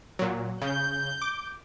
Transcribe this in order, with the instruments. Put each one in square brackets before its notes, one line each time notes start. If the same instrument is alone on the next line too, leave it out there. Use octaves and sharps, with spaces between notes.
[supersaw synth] A#2 F#3
[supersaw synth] C#3 [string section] G6
[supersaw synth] D6